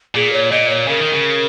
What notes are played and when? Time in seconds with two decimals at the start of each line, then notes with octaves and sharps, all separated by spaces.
0.15 A#2 G#4
0.32 C#5
0.51 A#2 D#5
0.69 C#5
0.88 C#3 A#4
1.00 D#3
1.13 C#3